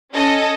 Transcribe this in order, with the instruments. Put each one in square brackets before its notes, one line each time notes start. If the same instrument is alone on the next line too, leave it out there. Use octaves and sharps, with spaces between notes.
[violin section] C#4 A4 D#5